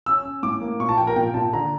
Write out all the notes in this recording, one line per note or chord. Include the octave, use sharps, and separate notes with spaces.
C#4 E6
C#4
A2 D6
A#3
A#2 C#6
A5
F3 G5
A#4
A#2 G5
A#2 A5
D3 A#5